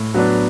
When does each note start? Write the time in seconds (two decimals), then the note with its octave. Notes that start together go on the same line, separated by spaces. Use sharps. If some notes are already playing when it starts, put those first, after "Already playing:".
Already playing: A2
0.14 F#3 B3 D4